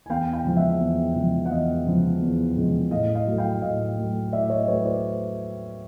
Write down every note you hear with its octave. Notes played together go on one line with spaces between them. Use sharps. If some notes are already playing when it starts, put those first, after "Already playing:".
G#5
E2 F5 G5
F5 G5
C#3 F3 G#3
E5 F#5
E2
C#3 F3 G#3
F#5
E2 D#5 F5
C#3 F3 G#3
E2
C#3 F3 G#3
A2 D#5 F5
D#5 F5
F#3 A3
F5 G5
A2 D#5 F5
F#3 A3
A2 D5 E5
C#5 D#5
F#3 A3 B4 C#5
C5 D5